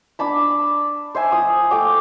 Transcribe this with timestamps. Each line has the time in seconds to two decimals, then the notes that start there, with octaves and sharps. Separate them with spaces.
0.19 D4 D5 A5 B5
1.15 C5 E5 G#5 A5
1.32 F3 D#6
1.71 A3 A4 G5 D6